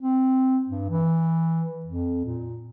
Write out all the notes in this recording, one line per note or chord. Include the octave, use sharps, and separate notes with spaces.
C4
G2
E3
F2
A#2